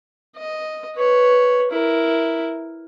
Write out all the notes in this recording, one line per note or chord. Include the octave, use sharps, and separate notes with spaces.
D#5
B4 C#5
E4 A#4